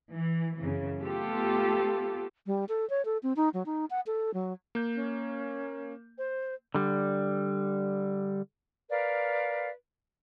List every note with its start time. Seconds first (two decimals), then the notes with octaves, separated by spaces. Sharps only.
0.11 E3
0.57 F#2 C#3 E3
0.99 A3 B3 F4 G4 A4
2.46 G3
2.69 A4
2.90 C#5
3.05 A4
3.23 C4
3.36 D#4
3.54 F#3
3.66 D#4
3.90 F#5
4.07 A4
4.34 F#3
4.75 A#3 G6
4.95 C#4
6.18 C5
6.75 D3 G3
8.90 A#4 B4 D5 F5